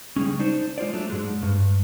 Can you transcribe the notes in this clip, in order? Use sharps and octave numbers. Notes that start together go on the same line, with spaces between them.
C#3 G3 G#3 C#4
D4 D#4 C5
G#3 F4 C5 D5
F#3 A3 D4
G#2 G#3
G2